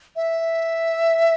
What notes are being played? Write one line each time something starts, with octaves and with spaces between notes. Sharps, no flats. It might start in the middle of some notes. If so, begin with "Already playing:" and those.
E5